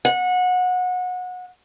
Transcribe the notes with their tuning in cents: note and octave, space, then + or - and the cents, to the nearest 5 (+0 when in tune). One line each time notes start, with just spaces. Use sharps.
F#5 -25